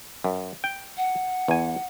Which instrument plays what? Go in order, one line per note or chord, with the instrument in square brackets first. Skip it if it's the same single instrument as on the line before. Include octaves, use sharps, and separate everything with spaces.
[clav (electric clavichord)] F#2
G5
[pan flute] F#5
[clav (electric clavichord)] E2 G#5